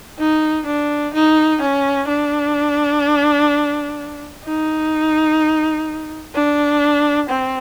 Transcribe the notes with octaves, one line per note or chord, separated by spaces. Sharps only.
D#4
D4
D#4
C#4
D4
D#4
D4
C4